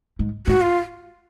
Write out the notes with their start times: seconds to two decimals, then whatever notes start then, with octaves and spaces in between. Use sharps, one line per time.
0.19 G#2
0.47 G#2 F#4
0.61 F4